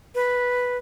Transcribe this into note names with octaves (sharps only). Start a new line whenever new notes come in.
B4